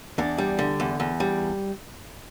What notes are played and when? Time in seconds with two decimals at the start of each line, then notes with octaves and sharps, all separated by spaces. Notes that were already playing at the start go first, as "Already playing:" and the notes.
0.18 E2 D4
0.38 G3
0.59 D3
0.80 E2
1.00 E2
1.20 G3